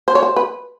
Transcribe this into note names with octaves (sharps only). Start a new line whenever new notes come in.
C5
C#5
C5
B4